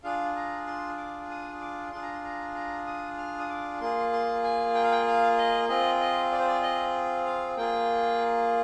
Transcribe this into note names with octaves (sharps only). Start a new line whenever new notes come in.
D4 F4 G#4 F5
A#5
C6
D6
D#6
D6
D4 F4 G#4 C6
A#5
C6
A#5
A#5
D#6
F6
D#6
D6
A#3 F4 G#4 C6
C6
G#5
G5
F5
G5
F5
D#5
C4 F4 G#4 D#5
D#5
D5
C5
D5
D#5
F5
A#3 F4 G#4 G5